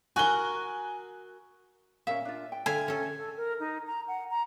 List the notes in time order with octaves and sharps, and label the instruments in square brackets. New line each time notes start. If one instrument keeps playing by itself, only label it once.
[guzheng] F#4 A#4 [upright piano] G#5 F#6 G7
[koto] A#2 E5 [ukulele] C#4 F5
[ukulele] D4 F4
G5
[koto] D3 E5 F5 [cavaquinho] G#5
[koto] C#4 A4
[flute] A4
A#4
D#4
A#5
F#5
A#5